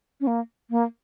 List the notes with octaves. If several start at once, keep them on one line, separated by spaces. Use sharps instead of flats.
C#4
A#3
A#3